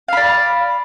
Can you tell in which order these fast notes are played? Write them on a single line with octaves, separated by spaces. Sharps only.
F5 B5 D5